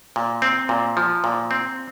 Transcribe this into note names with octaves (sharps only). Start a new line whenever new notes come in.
A#2
C4
A#2
F3
A#2
C4